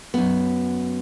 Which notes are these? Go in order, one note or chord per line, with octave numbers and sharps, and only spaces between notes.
F#2 B3